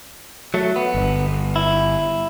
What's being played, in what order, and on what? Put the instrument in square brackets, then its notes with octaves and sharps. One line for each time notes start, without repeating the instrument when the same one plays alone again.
[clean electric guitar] F#3 A3
B3
[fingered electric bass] G1
[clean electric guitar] E4